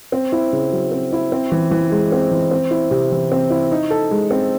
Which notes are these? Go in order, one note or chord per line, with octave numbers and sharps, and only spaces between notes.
C4
E4
C#3
F#3
C4
E4
C4
E3
E3
G#3
C4
E3
C4
E4
C3
E3
C4
E4
D#4
A4
G#3
C4